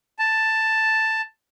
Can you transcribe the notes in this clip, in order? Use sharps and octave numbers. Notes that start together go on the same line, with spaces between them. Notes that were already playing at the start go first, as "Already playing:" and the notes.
A5